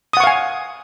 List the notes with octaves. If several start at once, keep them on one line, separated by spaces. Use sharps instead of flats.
F5 F#5 G#5 C#6 D#6